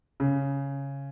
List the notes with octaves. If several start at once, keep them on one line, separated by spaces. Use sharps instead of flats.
C#3